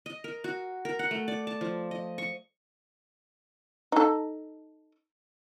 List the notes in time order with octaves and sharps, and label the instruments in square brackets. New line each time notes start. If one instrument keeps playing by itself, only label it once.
[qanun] D#5
A#4
F#4
A#4
F#5
A3
D5
A5
F3
D#5
C#6
[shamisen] D#4 A4